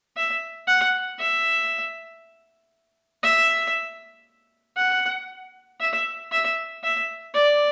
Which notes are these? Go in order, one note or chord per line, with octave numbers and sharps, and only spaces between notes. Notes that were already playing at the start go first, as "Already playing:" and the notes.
E5
F#5
E5
E5
F#5
E5
E5
E5
D5